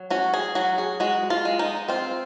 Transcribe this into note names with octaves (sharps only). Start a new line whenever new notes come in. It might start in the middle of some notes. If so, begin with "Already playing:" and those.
Already playing: F#3
C#4 F#4
G#4
F#3 F#4
G#4
G#3 F#4
F4
G#3
D#4
C4 F4